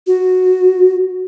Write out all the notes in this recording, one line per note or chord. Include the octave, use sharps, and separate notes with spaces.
F#4